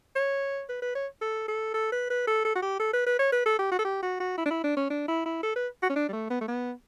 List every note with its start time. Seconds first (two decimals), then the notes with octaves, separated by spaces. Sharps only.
0.16 C#5
0.69 B4
0.82 B4
0.95 C#5
1.21 A4
1.48 A4
1.74 A4
1.92 B4
2.10 B4
2.27 A4
2.45 A4
2.56 F#4
2.62 G4
2.80 A4
2.93 B4
3.06 B4
3.19 C#5
3.32 B4
3.46 A4
3.59 G4
3.72 F#4
3.79 A4
3.85 G4
4.03 F#4
4.20 F#4
4.37 E4
4.45 D4
4.50 E4
4.64 D4
4.77 C#4
4.90 D4
5.08 E4
5.26 E4
5.43 A4
5.56 B4
5.83 F#4
5.90 C#4
5.96 D4
6.08 G3
6.13 A3
6.30 B3
6.41 A3
6.48 B3